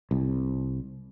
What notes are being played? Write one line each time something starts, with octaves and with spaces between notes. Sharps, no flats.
C2